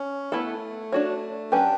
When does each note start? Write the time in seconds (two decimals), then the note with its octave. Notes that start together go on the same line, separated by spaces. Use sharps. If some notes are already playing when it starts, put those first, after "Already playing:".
Already playing: C#4
0.32 A3 B3 E4 A4
0.92 D4 F#4 C#5
1.51 F#3 C#4 D4 G4 B4